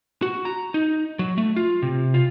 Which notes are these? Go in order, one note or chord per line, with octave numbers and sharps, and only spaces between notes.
F#4
A#5
D#4
F#3
A3
F4
C3
F4